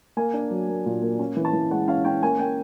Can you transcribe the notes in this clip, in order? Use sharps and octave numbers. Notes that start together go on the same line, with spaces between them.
A#3 G#5
D4
F#3
A#3
A#2
A#3
C#4
E3
A5
E3
G#3 F#5
C#4 F5
C#4 G5
A#3 G#5
A#3 G5